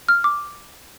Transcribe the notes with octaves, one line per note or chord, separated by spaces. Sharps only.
F6
D6